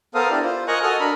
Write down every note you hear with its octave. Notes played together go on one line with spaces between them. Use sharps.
B3 A4 A#4 C5 F5 D#6
D4 E4 G4 D5
F4 C5
A#4 D#5 G#5 A#5 C#6 F#6
F#4 A4 D#5 D#6 F6
D4 A#4 B5